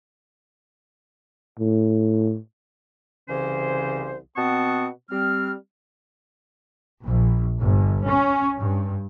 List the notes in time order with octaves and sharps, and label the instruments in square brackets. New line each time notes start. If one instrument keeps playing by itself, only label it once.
[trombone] A2
[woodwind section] C2 C#3 E3 C#4 C5
B2 C4 F#5 A5 C#6 D#6
G3 C4 F6
[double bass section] A#1
G1
C#4
G2